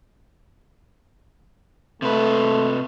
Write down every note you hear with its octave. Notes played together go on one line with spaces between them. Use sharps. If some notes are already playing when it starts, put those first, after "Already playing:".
C3 A3 B4